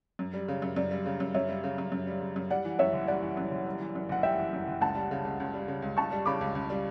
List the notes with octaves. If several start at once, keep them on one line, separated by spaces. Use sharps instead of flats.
F#2
G3
C#3
F#2
F#2 D5
G3
C#3
F#2
F#2 C#5 E5
G3
C#3
F#2
F#2
G3
C#3
F#2
G3 D5 F#5
E3
F#2 C#5 E5
F#1
G3 D5 F#5
E3
F#2
F#1
G3
E3
F#2
F#1 F#5
G3 E5 G5
E3
F#2
F#1
C#2 F#5 A5
G3
C#3
C#2
C#2
G3
C#3
C#2
C#2 A5 C#6
G3
C#3 B5 D6
C#2
C#2
G3